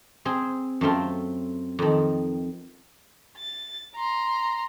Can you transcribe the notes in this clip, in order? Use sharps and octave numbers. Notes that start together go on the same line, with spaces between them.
C4 G#4
F#2 A3 C4 F4
F2 D#3
A6
A#5 C6